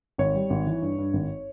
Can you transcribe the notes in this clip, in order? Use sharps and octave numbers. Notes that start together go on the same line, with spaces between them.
G#1 C#5
G3
G#1
E3
G2
G2
G#1